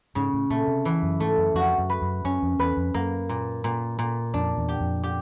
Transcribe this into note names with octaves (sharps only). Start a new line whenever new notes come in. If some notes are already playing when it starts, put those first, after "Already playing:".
G#2 C#3
A2
A#2 A3
C3
E3
F#2
G#2 A3
F#2
F2 F#4
F#2
B4
F#2
F#2 C#4
F2
E2 B4
F2
F#2 A#3
A#2
A#2
A#2
F2 D4
E2
G4
F2
G4